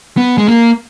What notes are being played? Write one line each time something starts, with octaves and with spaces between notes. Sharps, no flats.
B3
G#3
A#3